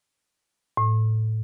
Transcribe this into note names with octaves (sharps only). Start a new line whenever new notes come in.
A2